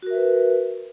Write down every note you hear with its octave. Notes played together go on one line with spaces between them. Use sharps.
F#4 A#4 B4 E5